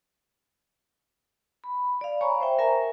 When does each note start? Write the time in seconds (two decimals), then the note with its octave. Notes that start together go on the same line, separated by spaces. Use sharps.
1.64 B5
2.01 D5 F5
2.21 C#5 G#5 A#5 B5 C#6
2.40 C5 E5 G5
2.58 A#4 E5 G#5 A#5